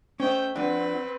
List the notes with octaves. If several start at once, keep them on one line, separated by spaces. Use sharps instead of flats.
A3 C#4 C5 D#5 G5
F3 C4 D4 B4 F#5